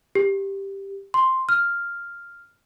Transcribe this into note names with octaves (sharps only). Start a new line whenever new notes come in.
G4
C6
F6